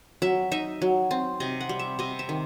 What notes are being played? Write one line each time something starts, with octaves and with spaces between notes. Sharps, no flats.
F#3 E5
D#4 E5
F#3
C4
C3 D#5
F#5
G3
E5
C3 D#5
E5
D#3